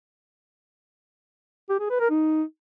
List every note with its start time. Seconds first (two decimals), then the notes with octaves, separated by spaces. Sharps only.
1.70 G4
1.80 G#4
1.90 B4
2.00 A#4
2.10 D#4